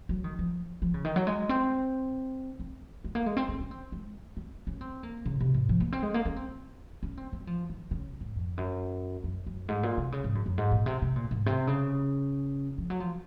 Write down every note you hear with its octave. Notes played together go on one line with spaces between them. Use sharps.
F#3
D#3
F3
F3
C#3
D#3
F#3
G#3
C4
C4
G#3
A#3
G#3
C4
C4
C#4
C4
G#3
C4
C#4
C4
A#3
C#3
C3
G#2
F3
A#3
C4
G#3
A#3
C#4
C4
C#4
C4
C4
F#3
F3
D#3
C#3
G#2
F2
F#2
F#2
F#2
G#2
A#2
C3
C#3
G#2
F#2
F#2
G#2
A#2
C3
C3
A#2
G#2
C3
C#3
F3
F#3
F3